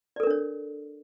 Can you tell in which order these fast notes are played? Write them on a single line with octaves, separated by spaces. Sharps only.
D5 A4 A#4 D4 C#5